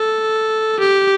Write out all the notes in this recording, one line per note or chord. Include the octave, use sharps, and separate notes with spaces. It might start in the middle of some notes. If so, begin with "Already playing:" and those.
Already playing: A4
G4